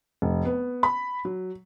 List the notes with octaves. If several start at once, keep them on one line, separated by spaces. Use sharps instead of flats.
F1
B3
B5
F#3